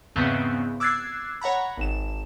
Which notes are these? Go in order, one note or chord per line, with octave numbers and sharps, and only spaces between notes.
E2 G#2 C#3 B3 C4
D6 E6 F#6 G#6 A6 C7
C#5 F#5 A#5 B5
G#1 E7